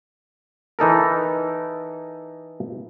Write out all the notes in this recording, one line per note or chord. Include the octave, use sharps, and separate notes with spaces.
E3 D#4 A4 A#4